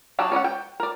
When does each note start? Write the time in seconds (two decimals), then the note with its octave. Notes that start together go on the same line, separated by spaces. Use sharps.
0.19 F#3 D4 D#4 G4
0.32 C#4 D5 D#5 F#5
0.44 G5
0.80 A#4 D5